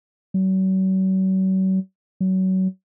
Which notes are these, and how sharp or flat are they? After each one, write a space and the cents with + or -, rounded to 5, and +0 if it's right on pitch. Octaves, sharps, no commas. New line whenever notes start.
F#3 +40
F#3 +25